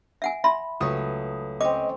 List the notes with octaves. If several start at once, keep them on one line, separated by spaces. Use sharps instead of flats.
E5 F#5 G#5
E5 B5 C6
C#2 F#3 A3 B4 D#6
C4 C#4 D#5 D6